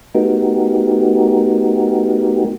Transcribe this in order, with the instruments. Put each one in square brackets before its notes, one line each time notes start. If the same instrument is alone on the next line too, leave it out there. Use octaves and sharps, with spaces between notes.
[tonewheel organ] A3 B3 D#4 F#4 G4 A#4